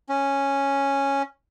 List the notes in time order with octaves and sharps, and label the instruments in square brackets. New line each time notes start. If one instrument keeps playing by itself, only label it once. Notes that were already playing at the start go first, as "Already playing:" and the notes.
[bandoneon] C#4